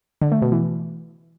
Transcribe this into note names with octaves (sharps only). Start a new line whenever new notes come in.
D3
A3
B2
E3